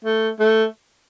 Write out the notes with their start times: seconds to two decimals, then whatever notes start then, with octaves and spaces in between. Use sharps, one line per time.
0.05 A3
0.40 A3